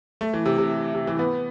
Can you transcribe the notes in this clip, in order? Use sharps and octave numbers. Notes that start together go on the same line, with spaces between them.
A3
E3
C3
C3
C3
E3
B3